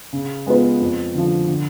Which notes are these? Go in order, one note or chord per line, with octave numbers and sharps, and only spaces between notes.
C#3
G#3 B3 F4 B4
F2
D3 F3
D3